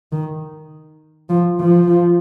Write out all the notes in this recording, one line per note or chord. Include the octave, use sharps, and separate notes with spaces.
D#3
F3
F3